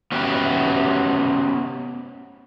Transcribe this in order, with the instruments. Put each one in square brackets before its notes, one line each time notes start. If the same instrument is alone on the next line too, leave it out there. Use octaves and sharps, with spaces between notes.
[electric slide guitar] B3 C#4 F#4 G4 G5